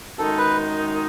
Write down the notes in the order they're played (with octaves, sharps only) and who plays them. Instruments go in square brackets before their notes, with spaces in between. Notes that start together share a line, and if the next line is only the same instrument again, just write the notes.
[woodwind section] F#2 D#3 G#3 D#4 [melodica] A4
[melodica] B4